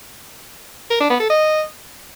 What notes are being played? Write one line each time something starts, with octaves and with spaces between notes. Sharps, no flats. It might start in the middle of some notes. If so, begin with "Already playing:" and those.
A#4
D4
B3
A4
D#5